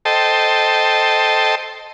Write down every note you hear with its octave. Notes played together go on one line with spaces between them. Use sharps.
A4 C5 D#5 G5 A5